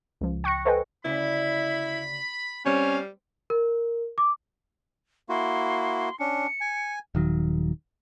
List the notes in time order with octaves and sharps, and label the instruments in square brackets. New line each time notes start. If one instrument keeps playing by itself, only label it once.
[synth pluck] C#2 F3
G5 C#6 F#6 A#6 C#7
A4 B4 C5 D#5 G5 G#5
[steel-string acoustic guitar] D2 C#3 D5 [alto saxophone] E4 [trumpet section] B5
[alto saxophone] G3 [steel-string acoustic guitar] C4 [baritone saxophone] C#4 [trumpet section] F5
[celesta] A#4
D6
[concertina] A#3 E4 F#4 [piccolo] C6
[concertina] C#4 D4 [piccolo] C#7
[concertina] G#5
[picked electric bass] D#1 D#3 F#3